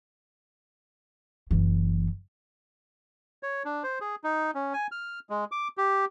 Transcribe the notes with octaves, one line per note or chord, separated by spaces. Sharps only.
F#1 E3
C#5
D4
C5
G#4
D#4
C#4
G#5
F6
G#3
D6
G4